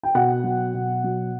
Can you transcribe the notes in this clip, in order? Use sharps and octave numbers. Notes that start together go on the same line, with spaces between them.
G5
B2 F#5
F#3
B2
F#3